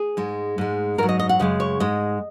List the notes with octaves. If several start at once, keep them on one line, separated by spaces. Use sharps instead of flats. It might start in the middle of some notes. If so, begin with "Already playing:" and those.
Already playing: G#4
G#2 G#3
G#2 G#3
G#2 F#3 A#4
D#5
D#5
F#5
F#2 C#3 G#3 D#5
C#5
G#2 G#3 D#5